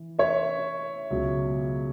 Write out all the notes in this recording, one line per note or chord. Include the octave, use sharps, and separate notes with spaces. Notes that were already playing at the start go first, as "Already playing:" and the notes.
Already playing: E3
C#5 E5
C#2 B2 F#3